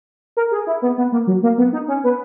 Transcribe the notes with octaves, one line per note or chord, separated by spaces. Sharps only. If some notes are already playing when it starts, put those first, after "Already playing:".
A#4
G#4
E4
B3
B3
A#3
F#3
A#3
B3
D#4
C#4
B3